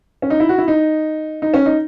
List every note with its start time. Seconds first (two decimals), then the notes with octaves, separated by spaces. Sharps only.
0.22 C#4
0.30 D#4
0.40 E4
0.49 F#4
0.58 E4
0.68 D#4
1.42 D#4
1.54 C#4
1.66 D#4